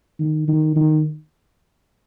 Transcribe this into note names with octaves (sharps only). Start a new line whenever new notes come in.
D#3
D#3
D#3